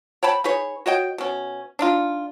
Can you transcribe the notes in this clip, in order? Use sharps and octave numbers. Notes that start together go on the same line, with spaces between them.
C#5 G5 A5 B5
D#4 G#4 B4 C#5
F#4 C#5 D#5 G5
B2 C#4
D4 D#4 F4